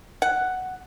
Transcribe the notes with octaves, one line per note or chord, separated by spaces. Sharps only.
F#5